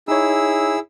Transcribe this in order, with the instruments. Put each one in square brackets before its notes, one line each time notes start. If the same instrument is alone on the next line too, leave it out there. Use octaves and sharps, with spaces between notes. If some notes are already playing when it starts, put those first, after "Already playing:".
[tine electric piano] D#4 C#5 [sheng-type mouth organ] E4 G#4 E6